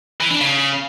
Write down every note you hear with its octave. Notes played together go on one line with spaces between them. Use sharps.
E3
D4
C#3